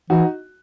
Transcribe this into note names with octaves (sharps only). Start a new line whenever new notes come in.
E3 D#4 F#4